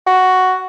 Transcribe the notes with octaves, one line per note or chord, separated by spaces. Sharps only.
F#4